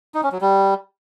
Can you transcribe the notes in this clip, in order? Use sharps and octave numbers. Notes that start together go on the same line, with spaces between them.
D#4
C#4
F#3
G3